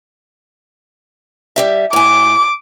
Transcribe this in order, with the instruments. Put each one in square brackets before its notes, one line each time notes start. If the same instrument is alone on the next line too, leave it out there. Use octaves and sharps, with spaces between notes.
[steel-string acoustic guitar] G3 G4 E5
[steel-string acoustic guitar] A2 G#5 [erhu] D6